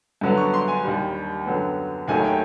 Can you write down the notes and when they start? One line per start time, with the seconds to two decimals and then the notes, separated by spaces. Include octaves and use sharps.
0.21 G2 D3 F#3 B3
0.37 C#6
0.54 C6
0.68 G#5
0.84 D#2 D#3 G3
1.46 F#2 D3 F#3 B3
2.08 D#2 D#3 F#3 A3 G#5
2.24 G5